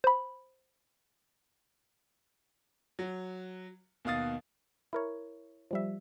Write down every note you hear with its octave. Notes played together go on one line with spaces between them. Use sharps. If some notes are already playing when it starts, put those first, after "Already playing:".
C5 B5
F#3
D#2 B2 F5 D#6 A6
E4 A#4 C#5
F3 G3 E5